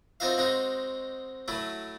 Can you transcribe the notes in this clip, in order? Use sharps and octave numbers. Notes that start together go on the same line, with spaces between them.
C4 D#4 F4 F#4 E5 F5
G#3 C4 D#4 F#4
F#3 A3 E4